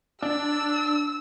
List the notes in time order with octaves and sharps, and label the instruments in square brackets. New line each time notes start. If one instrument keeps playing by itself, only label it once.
[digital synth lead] D4 [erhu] E6